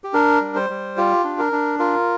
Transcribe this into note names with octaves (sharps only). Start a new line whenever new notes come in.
G4
D4 A#4
G3
C5
G3
F4 G4
D4
A#4
D4
F4 A#4